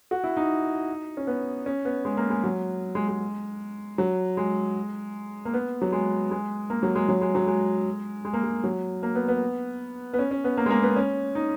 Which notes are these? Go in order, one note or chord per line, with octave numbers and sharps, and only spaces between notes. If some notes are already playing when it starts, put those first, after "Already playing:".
F#4
E4
D#4
C#4
B3
C#4
B3
G#3
A#3
G#3
F#3
G#3
G#3
F#3
G#3
A#3
B3
F#3
G#3
G#3
A#3
F#3
G#3
F#3
G#3
F#3
G#3
G#3
A#3
G#3
F#3
A#3
B3
B3
B3
C#4
C#4
B3
A#3
G#3
A#3
B3
C#4
D#4